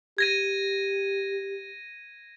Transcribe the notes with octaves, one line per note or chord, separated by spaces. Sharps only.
G4 G#6 A#6 D#7